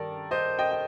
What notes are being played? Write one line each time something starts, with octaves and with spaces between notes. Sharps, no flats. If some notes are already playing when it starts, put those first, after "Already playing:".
Already playing: G2 D#3 G3 A4 A#4 D5
C5 D#5
D#5 G5
G5